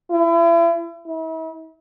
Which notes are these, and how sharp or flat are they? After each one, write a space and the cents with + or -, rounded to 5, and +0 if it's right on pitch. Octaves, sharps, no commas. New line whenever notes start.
E4 +35
E4 -40